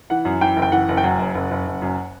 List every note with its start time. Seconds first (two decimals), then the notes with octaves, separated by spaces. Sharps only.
0.10 E3 F#5
0.25 F#2
0.41 E3 G5
0.56 F#1
0.62 G5
0.72 E3 F#5
0.89 F#1
0.97 G5
1.04 F#2 F#5
1.19 F#1
1.35 F#1
1.51 F#1
1.67 F#1
1.82 F#2